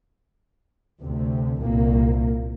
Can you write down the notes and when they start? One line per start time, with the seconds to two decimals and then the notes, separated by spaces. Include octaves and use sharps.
1.00 D2 C3
1.60 C2 A#2 A#3